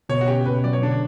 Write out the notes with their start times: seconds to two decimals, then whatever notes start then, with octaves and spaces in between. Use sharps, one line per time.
0.09 B2 C#5
0.21 F#4
0.27 C#4 G4
0.46 B2 B4
0.64 F#3 D5
0.73 C#5
0.82 D3 D4